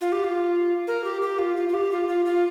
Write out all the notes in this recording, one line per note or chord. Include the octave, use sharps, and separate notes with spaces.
F4
G4
F4
A#4
G4
G4
F4
F4
F4
G4
F4
F4
F4